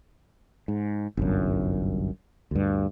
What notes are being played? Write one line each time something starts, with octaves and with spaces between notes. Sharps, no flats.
G#2
G1 C2 F#2
D2 G2